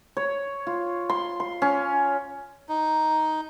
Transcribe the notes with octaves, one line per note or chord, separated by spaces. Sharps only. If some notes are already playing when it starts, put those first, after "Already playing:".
C#5
F4
C6
C6
C#4
D#4